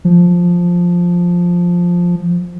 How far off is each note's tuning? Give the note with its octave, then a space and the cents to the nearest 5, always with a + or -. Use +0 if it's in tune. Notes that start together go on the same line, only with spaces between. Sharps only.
F3 +5